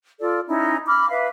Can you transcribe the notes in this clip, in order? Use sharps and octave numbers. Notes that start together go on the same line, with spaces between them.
F4 A4 D5
C#4 D#4 E4
B5 D6 F6
B4 E5 F5